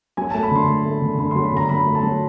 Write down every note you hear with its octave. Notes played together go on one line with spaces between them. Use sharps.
F#3 G#5
A3 A5
B5
D3 C6
A3
A3
D3
D3 B5
C6
F#3
B5
D3 A#5
F#3 B5
A3
A5
F#3